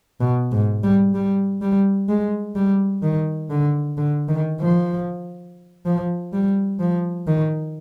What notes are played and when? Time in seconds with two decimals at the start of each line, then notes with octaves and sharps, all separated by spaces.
0.20 B2
0.52 G#2
0.83 G3
1.14 G3
1.61 G3
2.09 G#3
2.55 G3
3.02 D#3
3.50 D3
3.98 D3
4.29 D#3
4.60 F3
5.86 F3
6.33 G3
6.80 F3
7.27 D#3